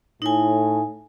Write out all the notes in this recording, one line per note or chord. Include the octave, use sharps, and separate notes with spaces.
A2 D#4 G#5